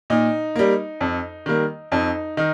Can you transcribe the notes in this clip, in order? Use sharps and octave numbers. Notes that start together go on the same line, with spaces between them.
A#2 D#4
G3 A#3
F2
D#3 G3 A#3
F2 D#4
D#3 D#4